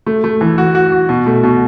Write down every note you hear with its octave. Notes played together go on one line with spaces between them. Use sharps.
A3
A3
E3
F#4
F#4
F#4
B2
A3
B2